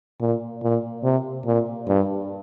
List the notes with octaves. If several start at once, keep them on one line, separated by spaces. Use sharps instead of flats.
A#2
A#2
C3
A#2
G2